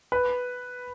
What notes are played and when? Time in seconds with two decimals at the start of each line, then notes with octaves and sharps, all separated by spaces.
0.12 B4